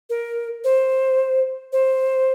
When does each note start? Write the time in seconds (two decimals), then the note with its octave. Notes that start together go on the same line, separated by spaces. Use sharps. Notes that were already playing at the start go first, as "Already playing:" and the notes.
0.09 A#4
0.64 C5
1.72 C5